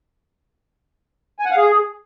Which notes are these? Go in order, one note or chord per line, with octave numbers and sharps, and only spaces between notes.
G#5
F#5
F5
G#4